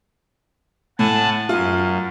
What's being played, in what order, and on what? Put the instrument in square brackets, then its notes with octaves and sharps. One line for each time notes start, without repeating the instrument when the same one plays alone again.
[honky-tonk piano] A2 [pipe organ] F#5 G#5 A5
[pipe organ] F#2 [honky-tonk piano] F4